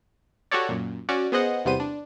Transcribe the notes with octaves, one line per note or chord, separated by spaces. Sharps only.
F#4 G4 A4 C#5 D5
F#2 A#2
C#4 F#4 D5
B3 G#4 C5 D#5 F#5
E2 C3 G3 B3 C5 D#7
D4